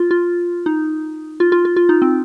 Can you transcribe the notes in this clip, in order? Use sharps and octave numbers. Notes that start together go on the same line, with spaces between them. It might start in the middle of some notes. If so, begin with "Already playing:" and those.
Already playing: F4
F4
D#4
F4
F4
F4
F4
D#4
C4